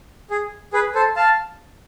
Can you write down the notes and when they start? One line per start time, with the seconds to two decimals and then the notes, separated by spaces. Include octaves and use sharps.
0.31 G#4
0.73 G#4 B4
0.95 A4 C5
1.16 F5 A5